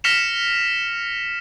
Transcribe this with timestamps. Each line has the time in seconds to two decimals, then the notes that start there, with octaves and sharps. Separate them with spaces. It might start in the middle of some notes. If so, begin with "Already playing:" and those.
0.04 F6 A#6 B6 C#7 E7 F7